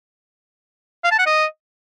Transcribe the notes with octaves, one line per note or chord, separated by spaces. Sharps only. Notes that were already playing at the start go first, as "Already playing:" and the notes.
F5
A5
F#5
D#5